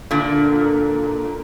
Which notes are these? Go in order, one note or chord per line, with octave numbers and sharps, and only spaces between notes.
A#2 D3